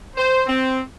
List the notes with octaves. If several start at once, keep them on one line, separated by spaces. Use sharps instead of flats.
C5
C4